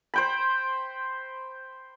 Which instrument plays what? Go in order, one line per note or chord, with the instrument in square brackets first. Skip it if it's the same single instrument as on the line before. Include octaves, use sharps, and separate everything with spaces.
[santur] C5 G5 B5